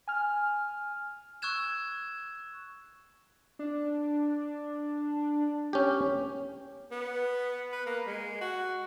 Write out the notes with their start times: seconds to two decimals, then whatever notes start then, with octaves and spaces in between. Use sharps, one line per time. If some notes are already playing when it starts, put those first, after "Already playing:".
0.08 G#5 F6
1.42 C#6 E6 F#6 G#6 E7
3.59 D4
5.73 C#4 G4
6.91 B3
7.72 B4
7.86 A#3
8.06 G#3
8.41 F#4